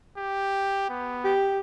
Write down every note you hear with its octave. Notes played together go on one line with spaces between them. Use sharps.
G4
B3
G4